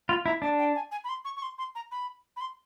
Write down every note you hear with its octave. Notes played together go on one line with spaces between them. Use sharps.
F4 B5
E4 A#5
D4 A5
G5
G#5
G#5
B5
C6
C#6
C#6
C6
C6
A#5
B5
B5
C6